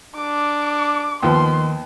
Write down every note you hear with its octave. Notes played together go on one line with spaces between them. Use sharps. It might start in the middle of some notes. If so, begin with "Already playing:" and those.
D4 D6
D#2 D#3 F3 B3 C6